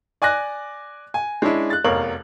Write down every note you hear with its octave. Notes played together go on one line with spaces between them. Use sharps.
D5 G#5 D6 F#6 A#6
G#5
G#3 C#4 D4 E4
F#6 A6
F1 E2 A#4 C#5 F5 F#7